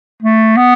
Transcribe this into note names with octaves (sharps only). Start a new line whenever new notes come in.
A3
B3